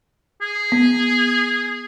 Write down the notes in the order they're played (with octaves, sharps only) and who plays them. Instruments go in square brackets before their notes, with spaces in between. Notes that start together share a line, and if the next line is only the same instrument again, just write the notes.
[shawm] G#4
[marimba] B3